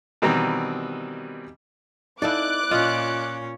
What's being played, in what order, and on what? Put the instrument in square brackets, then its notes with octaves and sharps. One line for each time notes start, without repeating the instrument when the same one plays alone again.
[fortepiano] B2 D#3 E3 G3 C4 A#5
[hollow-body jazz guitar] D#4 A4 F5 [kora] E4 D5 [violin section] D6 F#6
[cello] A#2 C#4 [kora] F4 [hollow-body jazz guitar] D#5